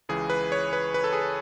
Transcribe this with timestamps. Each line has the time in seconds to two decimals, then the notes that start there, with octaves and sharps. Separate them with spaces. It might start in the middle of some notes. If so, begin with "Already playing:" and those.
0.09 C#2 C#3 E3 G#4
0.30 B4
0.52 C#5
0.73 B4
0.94 B4
1.04 A4
1.13 G#4
1.22 A4